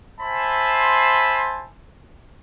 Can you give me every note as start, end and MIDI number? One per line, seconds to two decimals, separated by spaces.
0.21 1.68 72
0.21 1.68 76
0.21 1.68 80
0.21 1.68 81
0.21 1.68 83
0.21 1.68 84